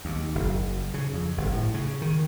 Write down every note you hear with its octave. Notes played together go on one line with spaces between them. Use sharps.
D#2
F#1
C#3
F2
G1
A2
C#3
D#3